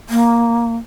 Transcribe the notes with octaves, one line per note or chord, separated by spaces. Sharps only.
A#3